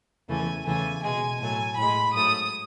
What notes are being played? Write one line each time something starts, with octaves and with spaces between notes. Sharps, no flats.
E2 C#3 E3 A3 G#5
E2 C#3 E3 A3 G#5
B2 G#3 G#5
A2 F#3 A3 G#5
A2 G#3 B5
G#2 F#3 A3 D#6